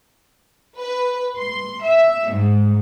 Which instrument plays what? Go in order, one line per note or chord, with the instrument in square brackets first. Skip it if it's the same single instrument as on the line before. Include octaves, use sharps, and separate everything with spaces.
[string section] B4
C6
E5
G#2